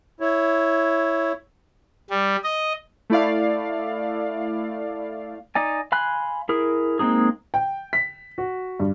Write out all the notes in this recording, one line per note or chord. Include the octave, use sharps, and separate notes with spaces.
E4 C#5
G3
D#5
A3 E4 D5 F5
D#4 D5 G#5
F5 G#5 B5 C6 F#6
E4 G#4 A#4
G#3 A#3 C4 D#4 G#4
G5
B6
F#4
G2